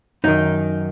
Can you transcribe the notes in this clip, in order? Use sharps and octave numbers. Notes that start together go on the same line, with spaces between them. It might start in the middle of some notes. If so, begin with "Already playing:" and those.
F#2 D#3 D#4